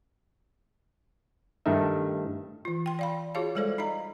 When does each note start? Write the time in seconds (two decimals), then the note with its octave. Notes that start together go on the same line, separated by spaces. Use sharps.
1.66 G2 D#3 A3 D#4 E5
2.65 E3 F4
2.86 G5 C6
2.99 D5 F5 B5
3.34 F4 F#4 G#4 C#5 F5 A5
3.55 G3 G#3 A4 C5 D5 F5
3.78 D#4 D#5 F5 A#5